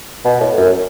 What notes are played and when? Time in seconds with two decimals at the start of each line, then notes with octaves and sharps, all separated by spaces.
0.25 B2
0.41 A2
0.57 F#2